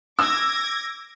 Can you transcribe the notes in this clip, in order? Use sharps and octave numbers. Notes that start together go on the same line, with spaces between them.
D6 E6 G#6 A#6